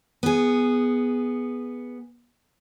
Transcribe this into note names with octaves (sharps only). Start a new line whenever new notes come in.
B3 G#4